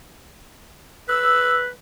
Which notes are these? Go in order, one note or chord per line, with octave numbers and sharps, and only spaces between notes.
B4 E6